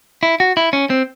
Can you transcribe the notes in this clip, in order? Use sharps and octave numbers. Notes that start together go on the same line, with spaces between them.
E4
F#4
E4
C#4
C4